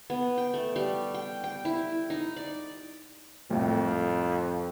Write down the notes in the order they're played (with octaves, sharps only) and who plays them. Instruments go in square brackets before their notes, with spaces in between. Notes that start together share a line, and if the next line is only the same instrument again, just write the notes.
[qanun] B3
G5
A3
G3
G5
G5
E4
D#4
D5
[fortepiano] C2 A2 [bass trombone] F2